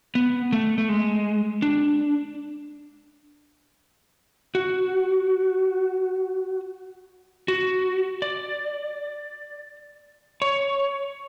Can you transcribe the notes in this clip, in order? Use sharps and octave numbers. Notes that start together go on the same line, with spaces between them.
B3
A3
A3
G#3
D4
F#4
F#4
D5
C#5